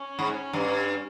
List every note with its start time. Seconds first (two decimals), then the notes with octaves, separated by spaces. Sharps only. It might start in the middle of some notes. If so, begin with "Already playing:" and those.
Already playing: C#4
0.19 G#2
0.53 G2